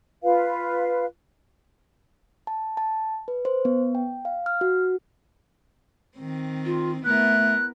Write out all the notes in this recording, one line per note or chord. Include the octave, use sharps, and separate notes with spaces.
F4 B4 F5
A5
A5
B4
C5
B3
G5
F5
F6
F#4
D#3 C4
F4
A3 B3 E4 A#4 F#6